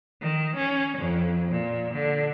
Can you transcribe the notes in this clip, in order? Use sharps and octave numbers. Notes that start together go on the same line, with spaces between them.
D#3
C#4
F2
A#2
D3